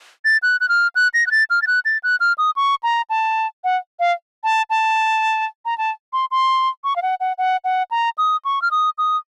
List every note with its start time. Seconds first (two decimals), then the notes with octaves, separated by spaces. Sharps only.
0.25 A6
0.43 F#6
0.61 F#6
0.69 F6
0.96 F#6
1.14 A#6
1.27 F#6
1.31 A6
1.50 F6
1.62 A6
1.67 F#6
1.85 A6
2.03 F#6
2.20 F6
2.38 D#6
2.56 C#6
2.83 A#5
3.10 A5
3.64 F#5
4.00 F5
4.44 A5
4.70 A5
5.65 A#5
5.78 A5
6.13 C6
6.31 C6
6.84 C#6
6.96 F5
7.02 F#5
7.20 F#5
7.38 F#5
7.64 F#5
7.91 A#5
8.18 D#6
8.45 C#6
8.62 F6
8.71 D#6
8.98 D#6